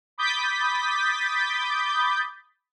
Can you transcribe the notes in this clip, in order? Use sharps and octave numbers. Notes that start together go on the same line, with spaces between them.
B5 D6 D#6 G6 A6 B6